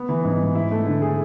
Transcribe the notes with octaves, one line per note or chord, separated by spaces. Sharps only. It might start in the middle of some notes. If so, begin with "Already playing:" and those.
Already playing: B3
E3
G#2
G#2
E4
A3
D3
G#4